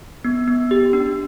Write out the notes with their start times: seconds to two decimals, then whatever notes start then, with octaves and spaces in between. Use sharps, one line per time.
0.24 B3
0.48 B3
0.71 G4
0.93 D4